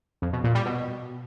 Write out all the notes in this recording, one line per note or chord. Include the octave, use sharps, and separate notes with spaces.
F2
B2
A#2
G3
B2